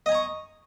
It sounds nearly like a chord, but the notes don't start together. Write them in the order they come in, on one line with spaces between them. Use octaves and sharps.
D#5 G#5 A#5 C#6